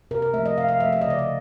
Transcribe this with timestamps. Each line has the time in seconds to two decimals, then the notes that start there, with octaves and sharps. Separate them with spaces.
0.11 C3 A#4
0.22 A#4
0.34 A3 E5
0.38 F3
0.46 D#5
0.58 C3 F5
0.69 F5
0.80 F3 A3 E5
0.93 E5
1.01 C#3 D#5
1.10 D5
1.19 D#5